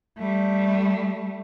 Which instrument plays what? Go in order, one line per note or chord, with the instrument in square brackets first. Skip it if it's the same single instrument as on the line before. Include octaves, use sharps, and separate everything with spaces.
[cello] G3 A3